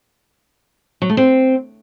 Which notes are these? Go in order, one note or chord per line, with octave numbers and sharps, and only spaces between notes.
F#3
A3
C4